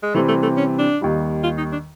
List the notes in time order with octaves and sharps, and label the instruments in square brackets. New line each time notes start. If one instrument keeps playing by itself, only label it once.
[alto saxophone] G#3
[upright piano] C3 E3 G3 C4 [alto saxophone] A3
[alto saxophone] A3
A3
C#4
D4
[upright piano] D#2 D#3 G3
[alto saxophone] F4
D#4
D4